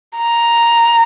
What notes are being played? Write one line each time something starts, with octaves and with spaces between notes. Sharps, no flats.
A#5